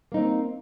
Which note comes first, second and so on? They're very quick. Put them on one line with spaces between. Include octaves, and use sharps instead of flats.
A#3 D#4 C4